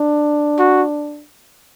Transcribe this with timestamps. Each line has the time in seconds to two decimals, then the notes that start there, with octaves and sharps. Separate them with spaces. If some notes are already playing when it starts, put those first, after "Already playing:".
Already playing: D4
0.59 F#4